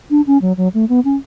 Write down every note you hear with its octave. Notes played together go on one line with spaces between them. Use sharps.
D4
C#4
F#3
F#3
A3
B3
C#4